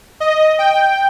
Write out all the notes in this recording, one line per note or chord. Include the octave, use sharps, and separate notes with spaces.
D#5
G5